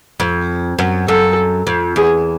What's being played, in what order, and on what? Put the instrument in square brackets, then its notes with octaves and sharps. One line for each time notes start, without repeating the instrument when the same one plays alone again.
[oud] F2
F#2
[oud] F#2 [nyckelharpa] A4
[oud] F2
[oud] E2 [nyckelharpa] G#4